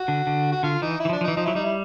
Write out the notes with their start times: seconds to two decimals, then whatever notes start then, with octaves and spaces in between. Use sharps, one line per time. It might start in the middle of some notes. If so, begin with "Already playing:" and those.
Already playing: F#4
0.08 D3
0.27 D3
0.52 F#4
0.63 D3 F4
0.82 E3 D#4
1.00 E4
1.05 E3
1.09 F3
1.13 D4
1.21 F3
1.24 D#4
1.28 E3
1.36 F3 D#4
1.46 F#3 E4
1.55 G3 D#4
1.64 E4